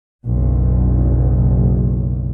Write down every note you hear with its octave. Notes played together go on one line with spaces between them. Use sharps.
F#1 B1